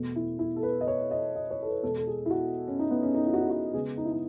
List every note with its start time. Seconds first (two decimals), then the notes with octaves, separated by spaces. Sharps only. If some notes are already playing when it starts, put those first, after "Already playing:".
Already playing: E2 B2 A3
0.16 E4
0.39 E4
0.56 A4
0.63 B4
0.81 D#5
0.87 C#5
1.11 D#5
1.36 D#5
1.51 C#5
1.62 A4
1.67 B4
1.83 E2 B2 G#3 A4
1.97 A4
2.07 G#4
2.26 E4
2.30 F#4
2.68 C#4
2.79 D#4
2.91 B3
3.03 C#4
3.15 D#4
3.26 E4
3.33 F#4
3.41 E4
3.50 F#4
3.73 C#3 G#3 B3 G#4
3.97 D#4
4.05 E4
4.12 D#4